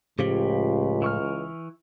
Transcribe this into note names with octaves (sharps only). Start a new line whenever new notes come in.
C#2 A2 C#3 F3 G4
E3 C#6 F6